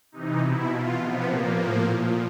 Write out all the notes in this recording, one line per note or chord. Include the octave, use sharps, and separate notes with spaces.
C3 E3 D#4
B2 E4
B2 F4
C3 F3 B3
A#2 F3 A#3
A2 F3
A#2 F3